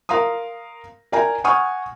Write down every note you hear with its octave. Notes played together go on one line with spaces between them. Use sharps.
A#4 F5 A#5 C6 D#6
A#4 D5 G5 G#5 A#5
F#5 G#5 C#6 D#6 F6